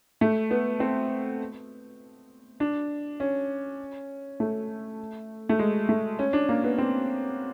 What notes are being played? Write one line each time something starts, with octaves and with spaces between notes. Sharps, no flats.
A3
B3
C4
D4
C#4
A3
A3
G#3
A3
C#4
D4
A#3
B3
C4